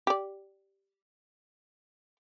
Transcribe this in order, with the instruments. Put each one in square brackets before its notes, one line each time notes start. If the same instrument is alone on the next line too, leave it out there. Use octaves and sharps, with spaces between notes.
[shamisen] G4 D5